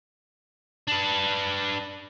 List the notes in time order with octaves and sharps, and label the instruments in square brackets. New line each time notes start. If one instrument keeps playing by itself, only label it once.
[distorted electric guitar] D4 B4